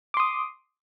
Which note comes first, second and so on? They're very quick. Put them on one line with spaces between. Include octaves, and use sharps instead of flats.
D6 C6 D#6